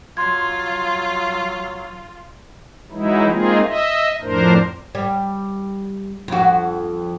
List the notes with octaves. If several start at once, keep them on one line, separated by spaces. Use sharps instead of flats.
F#3 F4 C6 G#6
E3 F#3 G#3 D#4 E4
G#3 A#3 C4 D#4 F4 G#4
D#5 E5
F2 A2 D4 A#4 C5
G3
F2 F#4